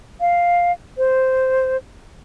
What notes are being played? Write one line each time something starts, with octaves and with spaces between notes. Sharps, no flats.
F5
C5